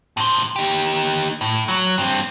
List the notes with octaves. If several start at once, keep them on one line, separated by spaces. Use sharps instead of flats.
A2 C5
D#4 G4
A2
F#3
G2 C4